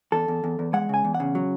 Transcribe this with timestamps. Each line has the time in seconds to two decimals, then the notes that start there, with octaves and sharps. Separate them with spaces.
0.12 E2 A4
0.28 E2
0.44 E2
0.59 E2
0.73 G#3 F#5
0.89 C#3 G#5
1.05 E2
1.14 F#5
1.20 C#3
1.35 F#3